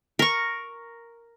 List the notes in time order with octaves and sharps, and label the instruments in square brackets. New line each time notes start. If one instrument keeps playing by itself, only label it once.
[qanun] A#4 C#6